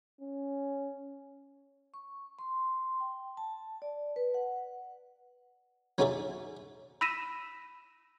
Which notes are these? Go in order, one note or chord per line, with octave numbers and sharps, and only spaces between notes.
C#4
C#6
C6
G5
A5
D5
B4
F#5
F#3 C#4 D#4 G#4 D5 E5
B5 E6 A#6 B6 D#7 E7